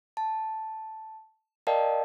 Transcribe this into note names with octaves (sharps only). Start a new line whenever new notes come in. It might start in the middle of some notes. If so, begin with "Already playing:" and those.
A5
A#4 D5 D#5 F5 G5 A5